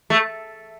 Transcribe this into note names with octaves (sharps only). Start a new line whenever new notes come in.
A3